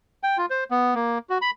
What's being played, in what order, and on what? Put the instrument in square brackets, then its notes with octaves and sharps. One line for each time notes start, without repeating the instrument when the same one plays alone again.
[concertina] G5
F4
C5
B3
A#3
F#4
B5